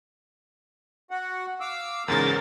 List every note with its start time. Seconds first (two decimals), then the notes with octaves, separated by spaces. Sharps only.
1.11 F#4 F#5
1.60 F5 D6 E6
2.08 E2 G#2 C#3 F#3 A#4 A6